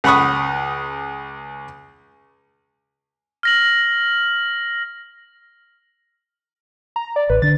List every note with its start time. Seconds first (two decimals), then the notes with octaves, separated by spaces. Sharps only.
0.04 C#2 F#5 B5 C#6 D#6
3.43 F6 A#6 F#7
6.96 A#5
7.16 D5
7.30 A1 B4
7.42 D3 D4 A6